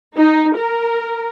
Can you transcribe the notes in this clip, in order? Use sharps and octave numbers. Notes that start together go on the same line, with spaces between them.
D#4
A#4